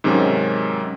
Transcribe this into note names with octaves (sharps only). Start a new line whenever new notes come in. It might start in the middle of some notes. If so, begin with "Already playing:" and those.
G#2 C3 D#3 F#3 C#4